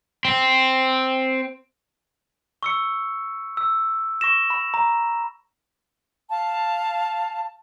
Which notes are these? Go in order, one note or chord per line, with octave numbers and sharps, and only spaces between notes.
C4
C#6 E6 C#7
E6
C#6 A#6 E7
B5
A#5
F5 A5